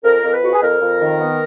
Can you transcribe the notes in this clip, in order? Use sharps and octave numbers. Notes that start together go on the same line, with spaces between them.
F2 A#4
F2
B4
F2 F#4
G#4
F2 A#4
F2
D#3
B3